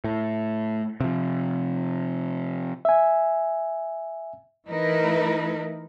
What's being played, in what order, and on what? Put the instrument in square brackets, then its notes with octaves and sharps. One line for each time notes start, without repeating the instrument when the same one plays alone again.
[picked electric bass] A2
C3 F3
[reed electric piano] E5 G#5
[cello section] E3 A3 D#4 E4 A#4 B4